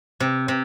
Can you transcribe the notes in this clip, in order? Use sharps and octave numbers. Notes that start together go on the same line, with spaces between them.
C3
C3